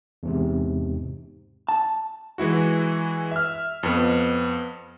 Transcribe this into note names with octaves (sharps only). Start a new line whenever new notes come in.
E2 G#2 C3
A5
E3 G#3 E4 F#4
E5 F6
F2 B3